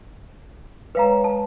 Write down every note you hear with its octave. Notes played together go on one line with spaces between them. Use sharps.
G#3 B4 C#5 F5 A#5
A5